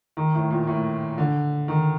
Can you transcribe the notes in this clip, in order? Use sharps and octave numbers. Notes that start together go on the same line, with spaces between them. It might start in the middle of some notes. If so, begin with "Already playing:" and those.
D#3
A2
A#2
A2
D3
D#3